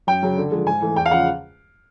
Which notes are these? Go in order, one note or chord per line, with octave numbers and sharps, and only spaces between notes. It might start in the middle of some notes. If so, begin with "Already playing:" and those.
F#2 G5
C#3 F#3
D3
F3 G#3
G#2 G#5
E3 A3
E2 G5
F5
C#3 F3 F#5